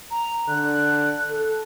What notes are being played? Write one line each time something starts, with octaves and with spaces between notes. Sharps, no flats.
A#5
D3 F#6
A4